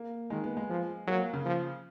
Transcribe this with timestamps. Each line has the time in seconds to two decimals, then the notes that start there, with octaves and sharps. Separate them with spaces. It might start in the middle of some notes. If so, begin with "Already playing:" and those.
Already playing: A#3
0.30 D#3 G#3
0.44 B3
0.57 G#3
0.69 F3
1.07 F#3 A#3
1.20 A#3
1.33 C#3
1.46 F3